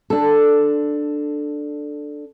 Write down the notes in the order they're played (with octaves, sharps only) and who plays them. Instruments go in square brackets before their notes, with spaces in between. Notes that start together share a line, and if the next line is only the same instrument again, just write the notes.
[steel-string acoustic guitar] D4 A4